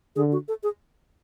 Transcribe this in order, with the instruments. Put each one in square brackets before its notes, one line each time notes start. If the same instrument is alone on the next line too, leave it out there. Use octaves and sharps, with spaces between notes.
[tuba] D3 [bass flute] G#4
[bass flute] F#4
A4
G#4